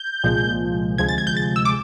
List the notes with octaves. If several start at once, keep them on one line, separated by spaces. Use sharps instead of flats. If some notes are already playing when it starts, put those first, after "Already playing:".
Already playing: G6
C2 A#2 F3 G#3
D2 C3 F3 G#3 G#6
A6
G#6
G6
A6
E6
D6